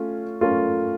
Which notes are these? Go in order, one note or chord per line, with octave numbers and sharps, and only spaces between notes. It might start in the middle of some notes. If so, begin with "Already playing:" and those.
Already playing: A3 C#4 F4
A3 C#4 F4 A#4